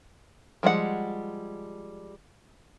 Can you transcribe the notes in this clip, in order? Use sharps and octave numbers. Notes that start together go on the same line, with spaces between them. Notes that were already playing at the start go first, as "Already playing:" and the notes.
F3 G3 G#3 F#5